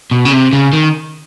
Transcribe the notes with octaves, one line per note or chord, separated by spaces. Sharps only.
B2
C#3
C3
C#3
D#3